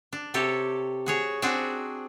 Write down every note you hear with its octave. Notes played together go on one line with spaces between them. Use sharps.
D4
C3 G4 A4 C#5
F#4 G#4 C#5
C4 D4 F#4 G#4